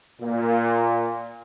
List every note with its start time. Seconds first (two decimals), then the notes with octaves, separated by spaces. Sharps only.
0.20 A#2